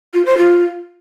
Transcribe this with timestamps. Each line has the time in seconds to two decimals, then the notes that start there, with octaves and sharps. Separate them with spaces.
0.14 F4
0.26 C5
0.38 F4